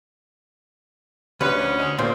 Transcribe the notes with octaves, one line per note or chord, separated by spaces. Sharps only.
D2 C#4 B4
F3
E2 G#3
G2 A#2 A#3 C5